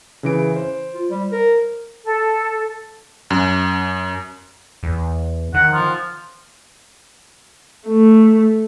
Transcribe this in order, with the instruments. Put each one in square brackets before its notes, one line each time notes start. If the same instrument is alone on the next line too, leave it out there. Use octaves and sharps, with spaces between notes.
[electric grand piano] C#3 E3 D7
C5
[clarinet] F4
G3
A#4
[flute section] A4
[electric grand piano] F#2
[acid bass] E2
[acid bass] D#3 [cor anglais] F#5
[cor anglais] F3
[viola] A3